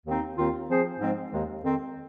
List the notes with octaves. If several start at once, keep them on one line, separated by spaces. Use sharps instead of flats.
D#2 D#3 C4 D#4
D#2 D#3 C4 F4
F3 C4 G#4 C5
G#2 F3 G#3 C4
D#2 D#3 G#3
F2 D#3 C4